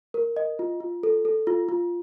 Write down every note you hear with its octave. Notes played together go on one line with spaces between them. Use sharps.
A#4
D#5
F4
F4
A4
A4
F4
F4